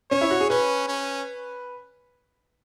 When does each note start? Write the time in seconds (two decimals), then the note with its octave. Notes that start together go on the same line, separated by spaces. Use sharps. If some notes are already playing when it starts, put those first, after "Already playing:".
0.11 C#4 C#5
0.21 E4
0.31 F#4
0.40 G#4
0.50 C#4 B4
0.88 C#4